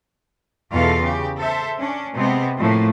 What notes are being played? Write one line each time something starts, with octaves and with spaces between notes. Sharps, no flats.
E2 B2 F4 A4 F5
C#3 G4
A4 C5 E5
C#4 D4
C3 G#3 B3 C4
A2 F3 A3 A#3